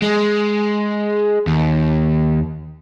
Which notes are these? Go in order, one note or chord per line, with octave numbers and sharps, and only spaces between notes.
G#3
D#2